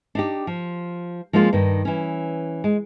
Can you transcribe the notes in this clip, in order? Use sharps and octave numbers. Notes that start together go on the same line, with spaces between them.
D4 D#4 G4
F3
F3 G#3 A#3 C#4 F4
G2 D#3
E3 C#4
G#3